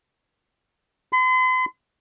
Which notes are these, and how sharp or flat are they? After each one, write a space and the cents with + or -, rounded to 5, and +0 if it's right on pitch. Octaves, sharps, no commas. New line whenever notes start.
C6 -45